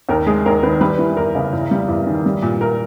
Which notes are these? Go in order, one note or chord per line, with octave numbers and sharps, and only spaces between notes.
D#2 A#4
G#3 G#4
D#2 A#4
D#3 B4
G3 B4
E3
E2 A#4
C#3
E2
G3
E2
D#3
G3
A#2
A#2 A#4